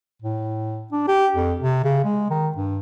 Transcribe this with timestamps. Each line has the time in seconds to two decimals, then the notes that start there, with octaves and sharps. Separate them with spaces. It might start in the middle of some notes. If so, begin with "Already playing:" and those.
0.22 A2
0.92 D4
1.08 G4
1.36 F2
1.60 C3
1.84 C#3
2.04 G#3
2.30 D#3
2.56 G2